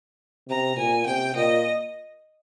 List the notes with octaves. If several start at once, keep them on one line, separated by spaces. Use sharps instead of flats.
C3 A#5
A#2 G#5
C3 G5
A#2 D#5